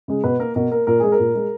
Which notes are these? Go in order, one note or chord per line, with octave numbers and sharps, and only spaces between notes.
C#3 G#3
B2 B4
A#3 A#4
B2 A#4
A#3 A#4
A#2 A#4
G#3 G#4
A#4
A#2
G#3